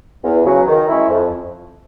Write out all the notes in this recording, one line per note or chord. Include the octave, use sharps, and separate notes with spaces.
E2
C#3 F#3
D#3
G#3 C#4 E4
F2